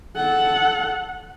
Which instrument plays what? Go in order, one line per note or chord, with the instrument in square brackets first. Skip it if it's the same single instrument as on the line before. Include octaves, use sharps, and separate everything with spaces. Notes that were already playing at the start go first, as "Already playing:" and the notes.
[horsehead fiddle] A4 F#5